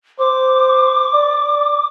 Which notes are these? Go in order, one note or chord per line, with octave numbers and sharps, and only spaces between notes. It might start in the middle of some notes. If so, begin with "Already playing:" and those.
C5 D6
D5